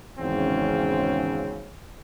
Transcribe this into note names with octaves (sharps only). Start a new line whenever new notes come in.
G#1 E2 G#2 C#3 C4 C#4